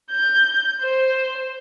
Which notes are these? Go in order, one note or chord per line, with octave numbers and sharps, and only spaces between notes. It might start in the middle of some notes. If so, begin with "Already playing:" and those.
G6
C5